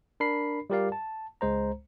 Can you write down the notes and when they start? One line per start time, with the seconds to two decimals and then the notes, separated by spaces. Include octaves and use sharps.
0.20 D4 A#4 B5 C7
0.70 G3 F4 G4 A#4 D5 F5
0.92 A5
1.41 C#2 G#3 C5 A#5